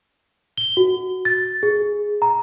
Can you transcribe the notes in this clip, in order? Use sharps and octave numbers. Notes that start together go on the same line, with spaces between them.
G7
F#4
A6
G#4
A#5